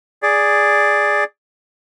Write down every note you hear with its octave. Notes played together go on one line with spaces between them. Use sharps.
G#4 D5